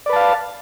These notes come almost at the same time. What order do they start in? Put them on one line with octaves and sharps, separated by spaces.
D5 B4 A5 F5